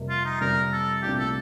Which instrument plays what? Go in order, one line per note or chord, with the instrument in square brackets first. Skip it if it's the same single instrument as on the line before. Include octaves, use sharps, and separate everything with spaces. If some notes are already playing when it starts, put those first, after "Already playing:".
Already playing: [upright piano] F2 C3 G3 A#3
[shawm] F4
D#4
[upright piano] F2 C3 G3 A#3 [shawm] A#4
[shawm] A4
[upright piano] C2 A#2 A3 D4 F4 [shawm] G4
[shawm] A4